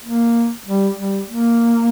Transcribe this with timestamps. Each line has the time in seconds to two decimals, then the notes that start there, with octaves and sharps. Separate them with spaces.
0.04 A#3
0.66 G3
0.98 G3
1.29 A#3